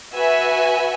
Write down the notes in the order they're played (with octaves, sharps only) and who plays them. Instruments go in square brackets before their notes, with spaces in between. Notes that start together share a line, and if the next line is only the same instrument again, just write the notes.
[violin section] F#4 B4 E5 G#5